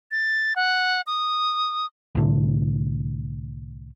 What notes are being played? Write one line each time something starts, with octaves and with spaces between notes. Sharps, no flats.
A6
F#5
D#6
C2 A2 D3